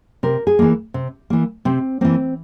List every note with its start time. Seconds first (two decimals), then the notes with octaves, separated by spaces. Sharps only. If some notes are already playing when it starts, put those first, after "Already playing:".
0.23 C3 A#4
0.47 G#4
0.59 E3 A#3
0.94 C3
1.30 E3 A#3
1.65 C3 C4
2.01 E3 A#3 C4